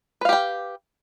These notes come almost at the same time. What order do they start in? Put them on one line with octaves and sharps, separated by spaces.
B4 F5 G4 G5